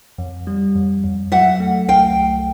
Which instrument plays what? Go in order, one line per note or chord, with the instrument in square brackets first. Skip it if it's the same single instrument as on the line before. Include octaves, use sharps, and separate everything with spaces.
[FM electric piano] F2
G3
F2
F2
[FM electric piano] F#3 [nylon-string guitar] E5 F#5
[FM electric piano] A3
[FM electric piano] C2 [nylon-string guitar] F5 G5
[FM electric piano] C2